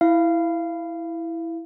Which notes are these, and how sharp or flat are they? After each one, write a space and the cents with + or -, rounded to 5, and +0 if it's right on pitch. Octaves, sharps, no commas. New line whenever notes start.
E4 +0 F5 -20